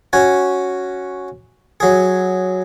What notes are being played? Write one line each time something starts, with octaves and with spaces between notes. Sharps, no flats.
C#4 F#4 G#5
F#3 G#4